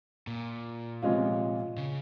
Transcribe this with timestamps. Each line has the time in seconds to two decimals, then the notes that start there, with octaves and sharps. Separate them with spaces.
0.27 A#2
1.02 C3 F3 G#3 C#4 F4
1.77 C#3